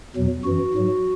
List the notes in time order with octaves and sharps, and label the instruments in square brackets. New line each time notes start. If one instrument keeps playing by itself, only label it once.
[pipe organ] E2 B2 F#3
F#2 E3 F#4
G#2 F#3